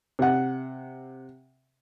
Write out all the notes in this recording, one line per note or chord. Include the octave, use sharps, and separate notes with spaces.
C3 F#5